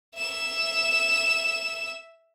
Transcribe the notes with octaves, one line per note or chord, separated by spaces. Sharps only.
E5 E7